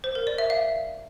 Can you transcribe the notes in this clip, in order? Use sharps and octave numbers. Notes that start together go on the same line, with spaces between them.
C5
A#4
D5
E5
F5